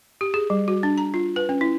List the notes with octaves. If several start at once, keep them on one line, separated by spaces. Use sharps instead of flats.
G4
G#4
G3
F#4
D4
A#5
F4
B4
C#4
E4